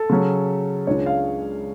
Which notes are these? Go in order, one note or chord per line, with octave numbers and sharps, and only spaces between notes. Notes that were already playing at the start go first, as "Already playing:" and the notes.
Already playing: A4
C#3 F#3 C#4
C#2 C#3 G#3 D4 C#5
F5